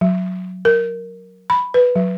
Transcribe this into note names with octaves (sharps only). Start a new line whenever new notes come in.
F#3
A#4
B5
B4
F#3